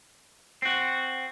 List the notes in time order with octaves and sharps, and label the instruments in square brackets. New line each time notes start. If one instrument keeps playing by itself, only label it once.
[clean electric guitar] C4 F#4